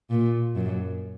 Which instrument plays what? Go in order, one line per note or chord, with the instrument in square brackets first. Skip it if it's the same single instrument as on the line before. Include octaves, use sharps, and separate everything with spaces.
[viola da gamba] A#2
F#2